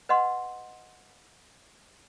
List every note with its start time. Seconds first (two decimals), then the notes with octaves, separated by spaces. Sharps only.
0.09 B4 D#5 F#5 C6